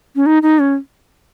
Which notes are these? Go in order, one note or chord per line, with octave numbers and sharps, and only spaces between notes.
C#4
D#4
D#4
C#4